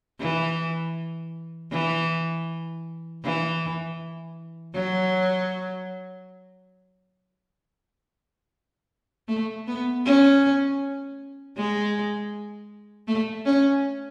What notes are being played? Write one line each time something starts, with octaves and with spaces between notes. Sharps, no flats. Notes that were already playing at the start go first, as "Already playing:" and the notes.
E3
E3
E3
F#3
A3
B3
C#4
G#3
A3
C#4